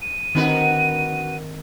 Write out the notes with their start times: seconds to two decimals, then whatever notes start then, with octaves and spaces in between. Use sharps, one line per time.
0.02 D#7
0.35 D3 D#3 C4 D#4 F#4 B4